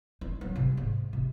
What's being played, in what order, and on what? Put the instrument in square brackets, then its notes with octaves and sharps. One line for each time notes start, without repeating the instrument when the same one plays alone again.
[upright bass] D#4
F#3
C3
G#2
C3